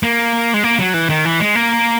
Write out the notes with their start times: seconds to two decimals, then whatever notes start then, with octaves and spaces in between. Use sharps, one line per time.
0.03 A#3
0.54 G#3
0.64 A#3
0.80 F#3
0.94 E3
1.10 D#3
1.25 E3
1.40 G#3
1.55 A#3